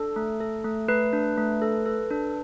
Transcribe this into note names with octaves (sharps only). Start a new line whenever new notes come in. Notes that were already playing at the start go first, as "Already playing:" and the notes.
Already playing: D4 A4
A3
A4
A3
A3 B4
D4
A3
A4
A4
D4